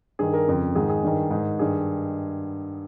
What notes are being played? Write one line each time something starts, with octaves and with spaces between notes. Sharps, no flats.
G2 D#3 G#4
A#4
F2 C#3
G#2 D#3 G#4
G#4
G2 D#3
G#2 D#3
G2 D#3 G#4